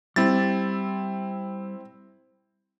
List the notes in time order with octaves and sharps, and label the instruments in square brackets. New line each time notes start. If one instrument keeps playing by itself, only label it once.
[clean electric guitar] G3 [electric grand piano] C4 E4 A6